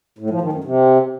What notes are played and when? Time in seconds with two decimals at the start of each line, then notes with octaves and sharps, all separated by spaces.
0.19 A2
0.30 F3
0.41 D#3
0.53 F#2
0.64 C3